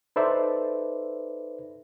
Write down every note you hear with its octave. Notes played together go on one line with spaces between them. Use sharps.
D#4 A4 B4 C5 D5 E5